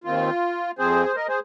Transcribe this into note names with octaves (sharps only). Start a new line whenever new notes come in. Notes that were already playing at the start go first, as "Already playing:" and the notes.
D#2 D#3 C4 F4
F2 F3 C4 G#4 C5
C5
A#4 D#5
G#4 C5